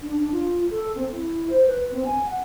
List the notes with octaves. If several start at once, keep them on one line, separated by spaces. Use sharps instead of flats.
D4
D4
F4
A4
C4
E4
C5
B4
C4
G#5
F#5